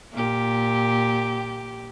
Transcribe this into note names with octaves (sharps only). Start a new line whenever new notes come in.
A#2 G4